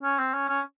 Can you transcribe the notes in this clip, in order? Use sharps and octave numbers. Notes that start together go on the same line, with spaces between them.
C#4
C4
C#4
C#4